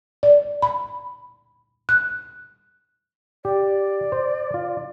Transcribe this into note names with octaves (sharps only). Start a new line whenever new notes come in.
D5
B5
F#6
G4 D5
C5
F4